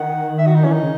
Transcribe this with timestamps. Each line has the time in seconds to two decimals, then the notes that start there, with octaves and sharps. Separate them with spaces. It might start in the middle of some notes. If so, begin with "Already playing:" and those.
Already playing: D#3 F#5
0.39 E5
0.46 F#4
0.55 D#4
0.64 E3 C#4
0.72 D#3 D#4
0.82 C#3